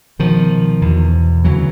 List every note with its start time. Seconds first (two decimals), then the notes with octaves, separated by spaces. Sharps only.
0.19 C2 B2 D#3 F3
0.81 E2 B2
1.44 D2 C#3 E3 F#3